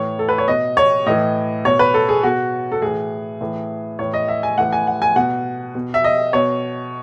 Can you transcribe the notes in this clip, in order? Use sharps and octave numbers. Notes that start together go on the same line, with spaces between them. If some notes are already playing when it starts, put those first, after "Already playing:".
Already playing: A2 E3 C#5
A4
B4
C#5
B2 D#5
C#5
A2 E3 D#5
B2 C#5
B4
A4
G#4
B2 F#4
A4
A2 E3 G#4
A2 E3
A2 E3 C#5
D#5
E5
G#5
A2 E3 F#5
G#5
F#5
G#5
B2 F#5
B2
E5
D#5
B2 C#5